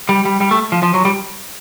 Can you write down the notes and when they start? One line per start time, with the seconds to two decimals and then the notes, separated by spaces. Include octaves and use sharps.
0.09 G3
0.25 G3
0.41 G3
0.51 A3
0.72 F3
0.83 F3
0.94 F#3
1.05 G3